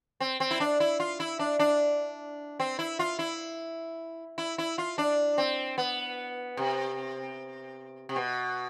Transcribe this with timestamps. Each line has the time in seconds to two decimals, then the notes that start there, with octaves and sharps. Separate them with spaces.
0.20 C4
0.40 C4
0.51 E4
0.60 D4
0.80 E4
1.00 F4
1.20 E4
1.39 D4
1.59 D4
2.60 C4
2.79 E4
2.99 F4
3.19 E4
4.38 E4
4.58 E4
4.78 F4
4.98 D4
5.38 C4
5.78 B3
6.57 C3
8.09 C3
8.16 B2